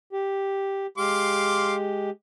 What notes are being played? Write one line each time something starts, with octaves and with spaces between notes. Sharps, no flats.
G4
G#3 G4 F5 C6 D6